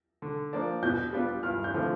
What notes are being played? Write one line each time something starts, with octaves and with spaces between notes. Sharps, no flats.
D3
F3 A#3 D4
B2 G6
G3 B3 D4 F4
G2 F6
G6
D3 F3 A3 C4